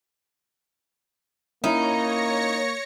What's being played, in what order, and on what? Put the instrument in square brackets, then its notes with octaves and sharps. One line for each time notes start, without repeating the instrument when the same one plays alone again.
[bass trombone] A#3 [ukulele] C#4 E4 [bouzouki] D#4 [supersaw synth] C#5 A#6 C#7